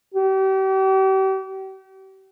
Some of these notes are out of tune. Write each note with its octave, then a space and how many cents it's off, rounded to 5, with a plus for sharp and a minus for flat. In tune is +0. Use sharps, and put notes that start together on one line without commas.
G4 -40